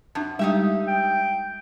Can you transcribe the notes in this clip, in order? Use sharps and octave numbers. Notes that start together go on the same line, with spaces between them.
F#2 D4 A5
G3 G#3 D#4 G4 E5
G5